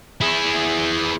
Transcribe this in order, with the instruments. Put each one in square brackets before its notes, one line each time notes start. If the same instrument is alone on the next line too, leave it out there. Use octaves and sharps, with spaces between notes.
[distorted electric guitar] E4 G#4